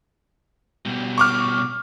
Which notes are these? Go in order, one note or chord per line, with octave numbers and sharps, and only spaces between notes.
B2 G3
C#6 D6 F6